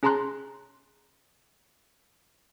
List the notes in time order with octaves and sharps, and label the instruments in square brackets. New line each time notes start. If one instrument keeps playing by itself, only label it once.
[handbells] C#4 G#4 A5 A#5 C6 F#6